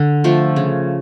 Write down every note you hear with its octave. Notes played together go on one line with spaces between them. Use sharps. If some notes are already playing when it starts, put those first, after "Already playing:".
Already playing: D3
F3 A3
C#3